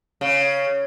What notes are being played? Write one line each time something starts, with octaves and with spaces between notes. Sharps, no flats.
C#3